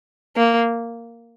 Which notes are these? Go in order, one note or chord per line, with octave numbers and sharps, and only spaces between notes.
A#3